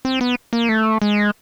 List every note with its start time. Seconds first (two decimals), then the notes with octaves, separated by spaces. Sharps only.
0.05 C4
0.21 B3
0.53 A#3
0.69 A3
1.02 G#3